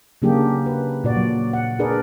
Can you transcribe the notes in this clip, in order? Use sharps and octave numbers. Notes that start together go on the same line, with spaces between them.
C#3 F#3 A#3 D4 G4 G#4
B4
A#2 F#4 D5
F#3
F#5
D4 G#4 A#4 B4 D5